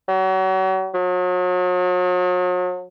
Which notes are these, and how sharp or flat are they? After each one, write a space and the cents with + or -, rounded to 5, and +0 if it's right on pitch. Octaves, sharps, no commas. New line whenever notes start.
F#3 +35
F#3 -40